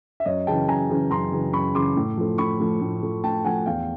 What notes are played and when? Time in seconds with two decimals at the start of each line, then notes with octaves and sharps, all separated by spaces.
0.20 E5
0.25 F#2 C#5 D#5
0.47 C#3 E3 G5 A5
0.68 F#2 G#5 A#5
0.90 C#3 E3
1.11 F#2 A#5 C6
1.32 C#3 E3
1.53 F#2 B5 C#6
1.75 C#3 E3 C6 D6
1.96 A2
2.17 F3 A3
2.38 A2 B5 C#6
2.60 F3 A3
2.81 A2
3.03 F3 A3
3.24 A2 G5 A5
3.45 F3 A3 F#5 G#5
3.66 E2 F5 G5